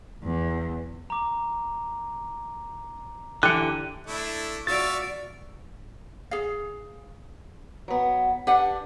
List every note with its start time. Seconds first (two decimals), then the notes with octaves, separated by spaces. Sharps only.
0.23 E2
1.10 A#5 D6
3.43 D3 E3 G4 F#6 C#7 D#7
4.07 A3 D4 E4
4.67 F#4 D5 E5 F5 C#6 A6
6.31 G#4 F5
7.88 F#3 B3
8.47 D4 G4 B4 F#5